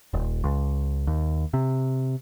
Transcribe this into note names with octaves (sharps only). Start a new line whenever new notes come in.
D#1
C#2
D#2
C3